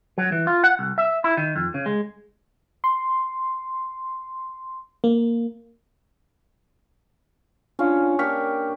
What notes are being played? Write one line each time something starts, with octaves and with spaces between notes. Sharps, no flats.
F#3
E3
F4
F#5
C2
E5
E4
D#3
F2
C#3
G#3
C6
A#3
C#4 D4 F4 F5
A#3 D4 G4 C#6 F6 B6